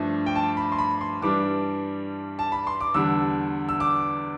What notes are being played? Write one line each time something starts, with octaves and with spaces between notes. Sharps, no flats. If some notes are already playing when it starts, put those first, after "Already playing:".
Already playing: G2 F3 A3 D4
G5
A5
B5
C6
B5
C6
G2 E3 G3 D4 D6
A5
B5
C6
D6
E2 D3 G3 D4 E6
E6
D6